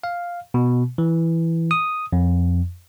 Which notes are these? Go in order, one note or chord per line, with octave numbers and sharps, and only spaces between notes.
F5
B2
E3
D#6
F2